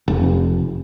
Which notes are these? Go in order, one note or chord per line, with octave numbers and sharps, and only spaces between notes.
F1